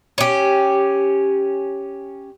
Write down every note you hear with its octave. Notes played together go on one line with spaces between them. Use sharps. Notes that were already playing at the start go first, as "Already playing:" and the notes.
C#4 G4